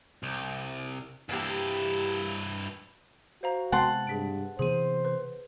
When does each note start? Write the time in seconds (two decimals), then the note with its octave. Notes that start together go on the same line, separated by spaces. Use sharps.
0.23 C2
1.29 G2 E3 A#3 E4 G4
3.43 F#4 C5 F5 A#5
3.72 C3 G#3 B3 F#5 G5 A5 C6
4.07 G2 G#4 B6 D7
4.59 C3 E3 B3 G#4 C5 D#7
5.05 B4